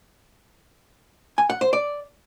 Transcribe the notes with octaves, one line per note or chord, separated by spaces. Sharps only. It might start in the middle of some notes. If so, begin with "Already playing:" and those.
G#5
F#5
C5
D5